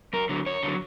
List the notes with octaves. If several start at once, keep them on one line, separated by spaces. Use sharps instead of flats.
F#2 A#4
D3 F#3
F#2 C#5
D3 F#3